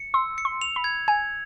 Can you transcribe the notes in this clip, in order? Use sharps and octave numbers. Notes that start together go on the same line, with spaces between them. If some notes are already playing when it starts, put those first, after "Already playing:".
Already playing: C#7
C6 E6
C#7
C6
F7
B5
G#6
G#5 G#6